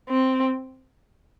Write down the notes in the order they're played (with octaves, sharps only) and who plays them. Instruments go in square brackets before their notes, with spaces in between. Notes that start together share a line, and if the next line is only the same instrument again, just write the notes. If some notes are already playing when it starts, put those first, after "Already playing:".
[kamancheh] C4